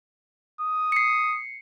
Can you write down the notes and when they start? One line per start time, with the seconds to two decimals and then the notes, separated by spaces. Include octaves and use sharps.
0.61 D#6
0.92 C7 C#7